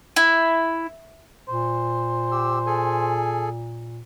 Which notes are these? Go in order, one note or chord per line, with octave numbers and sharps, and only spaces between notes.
E4
A#2 C5
G4 E6
G#4 A4 G#5